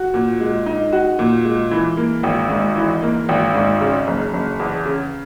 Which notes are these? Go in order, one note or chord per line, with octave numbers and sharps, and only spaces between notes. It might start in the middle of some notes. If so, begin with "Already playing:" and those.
Already playing: F#4
A#2
G#3
D#4
F#4
A#2
G#3
E3
A#3
G#1
G#2
E3
A#3
G#1
G#2
C#3
F#1
F#1
E2
C#3